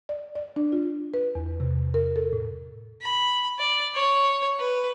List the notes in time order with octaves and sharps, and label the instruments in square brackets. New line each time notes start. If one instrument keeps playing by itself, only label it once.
[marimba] D5
D5
D4
F4
B4
E2
C3
A#4
A4
A2
[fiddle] B5
D5
C#5
B4